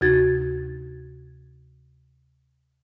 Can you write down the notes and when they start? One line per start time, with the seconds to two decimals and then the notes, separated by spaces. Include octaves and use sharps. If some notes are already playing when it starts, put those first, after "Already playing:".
0.01 D2 C3 D#4 F#4 G#6 A6